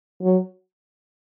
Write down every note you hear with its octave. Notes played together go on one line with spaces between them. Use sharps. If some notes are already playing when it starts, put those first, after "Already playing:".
F#3